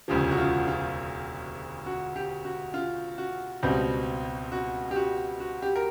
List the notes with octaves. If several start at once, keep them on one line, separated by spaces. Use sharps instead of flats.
E1 D2 C#3 F3 G4
F#4
F4
F4
F#4
G4
F#4
F4
F#4
C#2 B2 G3 C4
F#4
G4
F#4
F#4
G4
A#4